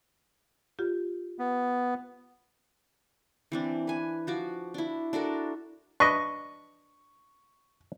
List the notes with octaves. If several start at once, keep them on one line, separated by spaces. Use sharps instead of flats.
F4 G4
B3
E3 C4 D4
B4 G#5
F3 F#4 D6
D4 E4
D4 F#4 A4 A#4
D4 B4 D#5 C#6